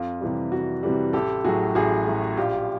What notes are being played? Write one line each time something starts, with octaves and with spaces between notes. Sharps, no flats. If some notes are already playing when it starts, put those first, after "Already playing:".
Already playing: F2 F4
C3 E3 G3
F2 F#4
C3 E3 G3
A1 G4 A4
A2 F#3 F#4 G#4
A1 F#4 G#4
A2 F#3
A#1 F4 G4